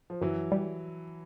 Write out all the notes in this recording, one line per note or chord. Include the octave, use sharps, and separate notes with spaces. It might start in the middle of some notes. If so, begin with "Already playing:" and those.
F3
F#2 E3 F#3
G3